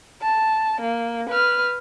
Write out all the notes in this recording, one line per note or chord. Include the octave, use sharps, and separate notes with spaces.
A5
A#3
B4 F6